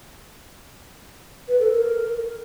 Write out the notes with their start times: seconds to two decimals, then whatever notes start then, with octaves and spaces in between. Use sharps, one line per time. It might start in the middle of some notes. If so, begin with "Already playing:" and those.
1.48 B4
1.60 A4
1.71 A#4